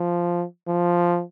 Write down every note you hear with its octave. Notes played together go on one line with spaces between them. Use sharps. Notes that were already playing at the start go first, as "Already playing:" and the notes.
Already playing: F3
F3